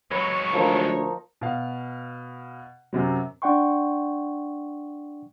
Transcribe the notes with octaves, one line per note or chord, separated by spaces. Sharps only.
F#3 G#3 B4 C#5
D2 F3 A#3 D#4
B2 F5
F#2 C3 F#3
D4 D5 F#5 G5 C6 C#6